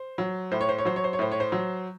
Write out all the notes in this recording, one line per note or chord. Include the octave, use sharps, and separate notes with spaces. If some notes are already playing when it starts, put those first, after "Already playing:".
Already playing: C5
F#3
A2 C5
C#5
C5
C#5
F#3 C5
C#5
C5
C#5
A2 C5
C#5
C5
F#3